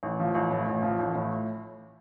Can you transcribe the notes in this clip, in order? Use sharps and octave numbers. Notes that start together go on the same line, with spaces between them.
A1
F3
A1
A2
A1
F3
A1
A2